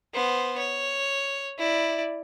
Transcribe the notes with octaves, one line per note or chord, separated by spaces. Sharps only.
B3 C5
C#5
E4 D5